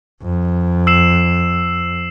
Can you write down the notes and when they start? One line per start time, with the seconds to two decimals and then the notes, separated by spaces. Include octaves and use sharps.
0.22 F2
0.87 E6 C7 E7